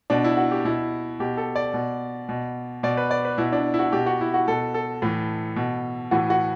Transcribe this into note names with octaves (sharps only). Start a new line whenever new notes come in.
B2 D4
E4
F#4
G4
B2 E4
B2 G4
A4
D5
B2
B2
B2 D5
B4
D5
B4
B2 E4
D4
E4
F#4
B2 G4
F#4
E4
F#4
B2 A4
A4
A2 E3
B2
A2 E3 F#4
F#4